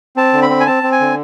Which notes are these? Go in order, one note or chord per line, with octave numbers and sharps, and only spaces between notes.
C4 A5
D3
B5
C4
G#5
C4 A5
C4
G#5
D3